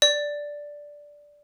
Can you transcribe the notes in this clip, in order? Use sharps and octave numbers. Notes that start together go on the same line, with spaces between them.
D5